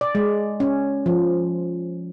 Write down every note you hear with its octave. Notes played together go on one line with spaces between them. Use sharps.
D5
G#3
C#4
F3